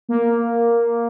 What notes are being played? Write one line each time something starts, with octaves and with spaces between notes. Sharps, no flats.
A#3